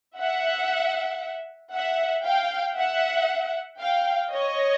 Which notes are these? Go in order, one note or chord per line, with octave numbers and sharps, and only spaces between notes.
E5 F#5
E5 F#5
F5 G5
E5 F#5
F5 G5
C#5 D#5